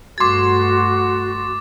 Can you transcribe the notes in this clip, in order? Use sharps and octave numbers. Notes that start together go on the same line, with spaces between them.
G2 A3 F#4 C6 D6 G#6 A6